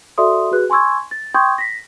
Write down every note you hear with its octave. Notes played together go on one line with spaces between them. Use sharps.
F#4 A4 D5 E5 C6 D#6
F#4 G#4 B4 F#6
G#5 C6 C#6 E6 G#6
A6
G5 C6 C#6 D#6 G6 G#6
A#6 B6